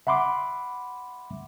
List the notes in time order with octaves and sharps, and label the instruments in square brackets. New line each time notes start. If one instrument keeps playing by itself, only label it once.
[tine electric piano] E5 F#5 B5 C6 D6